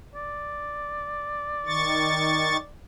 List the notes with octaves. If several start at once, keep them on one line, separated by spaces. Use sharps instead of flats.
D5
D#3 C#6 A6